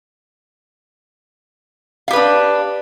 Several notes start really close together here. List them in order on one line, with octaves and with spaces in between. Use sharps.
F5 G4 B4 D4